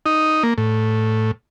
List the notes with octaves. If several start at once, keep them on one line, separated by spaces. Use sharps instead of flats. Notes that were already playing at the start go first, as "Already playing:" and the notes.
D#4
A#3
A2